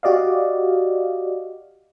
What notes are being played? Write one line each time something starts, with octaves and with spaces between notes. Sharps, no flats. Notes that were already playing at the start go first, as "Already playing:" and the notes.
F#4 G4 D5 D#5 F5